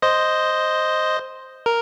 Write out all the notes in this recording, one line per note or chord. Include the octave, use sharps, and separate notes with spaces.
C5 D#5
A#4